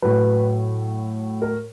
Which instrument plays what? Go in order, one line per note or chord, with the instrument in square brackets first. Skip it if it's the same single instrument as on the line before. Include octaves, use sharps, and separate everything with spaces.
[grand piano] A2 F#3 B4
A#4